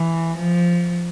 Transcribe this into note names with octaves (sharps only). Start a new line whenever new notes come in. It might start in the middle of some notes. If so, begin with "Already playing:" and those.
Already playing: E3
F3